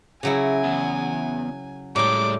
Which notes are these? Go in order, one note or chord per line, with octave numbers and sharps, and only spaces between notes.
C#3 F#3 E4 G#4 G#5 A#6 D7
E2 F#5
A2 G3 G#3 C#5 D5 G5 A#5 D6